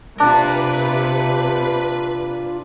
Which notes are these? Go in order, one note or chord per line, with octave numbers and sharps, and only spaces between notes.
C3 D4 F4 A#4 B4